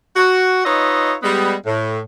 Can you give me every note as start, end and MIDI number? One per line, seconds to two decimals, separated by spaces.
0.15 0.60 66
0.65 1.14 63
0.65 1.14 65
0.65 1.14 71
0.65 1.14 73
0.65 1.14 75
0.65 1.14 76
1.23 1.53 55
1.23 1.53 56
1.23 1.53 59
1.65 1.99 45